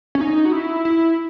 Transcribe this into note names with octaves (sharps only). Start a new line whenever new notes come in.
C#4
D#4
F#4
E4
E4